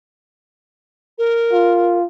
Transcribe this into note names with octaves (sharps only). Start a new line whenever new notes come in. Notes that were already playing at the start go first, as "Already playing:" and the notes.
A#4
F4